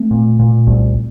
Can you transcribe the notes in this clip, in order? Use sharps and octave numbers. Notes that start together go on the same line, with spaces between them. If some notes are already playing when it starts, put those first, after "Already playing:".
Already playing: A3 C4
A#2
A#2
C2